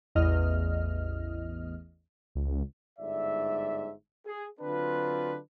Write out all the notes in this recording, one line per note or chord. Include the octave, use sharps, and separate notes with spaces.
A1 E2 D#5 F6
C#2
G1 G#2 D5 E5
G#4
D3 F#3 C4 D4 F4 B4